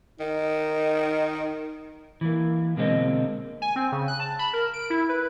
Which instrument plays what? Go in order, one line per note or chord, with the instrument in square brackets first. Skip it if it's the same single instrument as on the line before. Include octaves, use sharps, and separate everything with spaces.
[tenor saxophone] D#3 [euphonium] D#4
[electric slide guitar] E3 A#3
B2 D3 G#3 A#3 C4 D#5
[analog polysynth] G#5
C4
C#3
F#6
A5
B5
A#4
D7
E4
B4